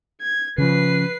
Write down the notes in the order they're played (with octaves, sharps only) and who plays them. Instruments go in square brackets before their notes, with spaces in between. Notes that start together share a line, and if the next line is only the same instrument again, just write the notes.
[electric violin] G#6
[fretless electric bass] C#3 F3 [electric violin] B4 C7